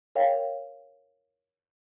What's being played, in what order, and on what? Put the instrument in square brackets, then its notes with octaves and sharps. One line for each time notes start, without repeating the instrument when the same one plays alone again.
[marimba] A#4 C#5 F5 G5